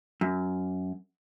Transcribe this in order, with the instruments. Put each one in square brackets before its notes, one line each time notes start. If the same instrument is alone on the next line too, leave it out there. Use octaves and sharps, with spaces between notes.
[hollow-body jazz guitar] F#2